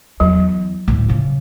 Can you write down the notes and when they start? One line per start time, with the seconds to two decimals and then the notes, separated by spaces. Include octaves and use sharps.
0.20 E2 F#3
0.88 D2 A2
1.08 C#3 F3